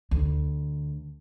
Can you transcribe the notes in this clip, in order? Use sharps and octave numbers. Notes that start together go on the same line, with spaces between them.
D2